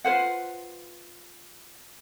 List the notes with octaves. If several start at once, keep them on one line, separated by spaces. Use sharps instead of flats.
F4 B4 C5 F#5